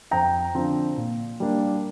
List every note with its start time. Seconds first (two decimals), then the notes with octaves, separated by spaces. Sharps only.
0.11 F2 G5 A#5
0.55 D3 F3 C4
0.97 A#2
1.40 G3 A#3 D4